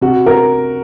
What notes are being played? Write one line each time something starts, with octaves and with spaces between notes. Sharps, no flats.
C3 F#4
A#4